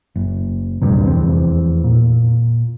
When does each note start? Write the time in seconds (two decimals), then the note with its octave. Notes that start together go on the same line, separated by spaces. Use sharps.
0.16 F#1
0.81 D#1 D2 G2 C3
1.05 F1 E2 C4
1.84 A#2